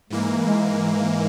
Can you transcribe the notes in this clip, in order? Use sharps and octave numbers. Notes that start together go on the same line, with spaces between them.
G#2 E3 G#3 A#3
G#3